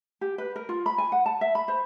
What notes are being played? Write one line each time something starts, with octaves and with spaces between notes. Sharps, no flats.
G4
B4
A#4
F4
B5
G#5
F#5
A5
E5
B5
C5